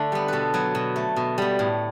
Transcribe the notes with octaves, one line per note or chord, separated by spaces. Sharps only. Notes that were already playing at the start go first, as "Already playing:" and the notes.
Already playing: D3 A3 A4
G3 B3
B2 A4 B4
F#3 B3
B2
A3
B2
G3 B3
A2